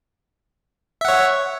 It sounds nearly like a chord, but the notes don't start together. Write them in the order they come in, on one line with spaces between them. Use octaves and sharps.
E5 F#5 C#5